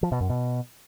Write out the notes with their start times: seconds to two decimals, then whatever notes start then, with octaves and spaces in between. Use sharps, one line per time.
0.03 F3
0.12 B2
0.21 F#2
0.29 B2